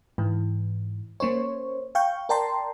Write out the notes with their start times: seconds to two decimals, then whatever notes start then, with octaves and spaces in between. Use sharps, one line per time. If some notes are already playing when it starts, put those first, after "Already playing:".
0.18 G#2 E3
1.20 A#3 C#4 C5 C#5
1.95 F5 G5 C#6 G6
2.29 A#4 D5 G5 A5 A#5 C6